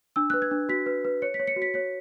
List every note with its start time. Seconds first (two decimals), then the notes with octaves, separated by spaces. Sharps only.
0.16 D4 E6
0.30 B4 F#6
0.42 G#6
0.51 D4
0.69 F#4 B6
0.86 B4
1.05 B4
1.22 C#5 C#7
1.34 B6
1.40 C#5
1.47 C#7
1.56 F#4
1.62 B6
1.74 C#5 B6